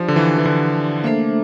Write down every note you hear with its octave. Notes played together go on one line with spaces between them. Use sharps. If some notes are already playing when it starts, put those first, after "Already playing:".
Already playing: F3 D4 G4 D5
D3
E3
E3
D3
A3 A#3 D4 A4 C5 E5